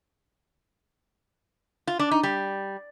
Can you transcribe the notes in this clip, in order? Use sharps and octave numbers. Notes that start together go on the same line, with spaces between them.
F4
D4
D#4
G3